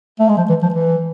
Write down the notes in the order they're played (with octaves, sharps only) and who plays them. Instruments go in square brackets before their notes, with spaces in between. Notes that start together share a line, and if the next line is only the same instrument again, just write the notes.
[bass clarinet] A3
G#3
F3
E3
F3
E3